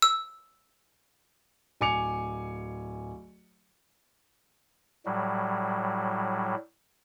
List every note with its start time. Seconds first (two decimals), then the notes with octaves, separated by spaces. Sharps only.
0.02 E6
1.81 D1 G#5 D6 C#7 F7
5.06 A2 F#3 G3